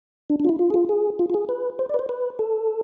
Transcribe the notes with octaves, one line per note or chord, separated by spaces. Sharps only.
D4
D4
F4
E4
F4
G#4
F4
G#4
F4
F4
G#4
B4
C5
D5
B4
C5
B4
A4